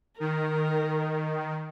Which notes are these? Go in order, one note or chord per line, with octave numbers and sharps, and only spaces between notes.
D#3 A#4